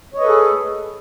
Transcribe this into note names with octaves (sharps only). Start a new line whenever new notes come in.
G#4 A4 B4 C#5 D#5